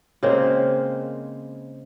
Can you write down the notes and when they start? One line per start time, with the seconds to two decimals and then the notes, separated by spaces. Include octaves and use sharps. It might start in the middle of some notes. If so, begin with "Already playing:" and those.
0.23 C#3 G#3 A#3 C4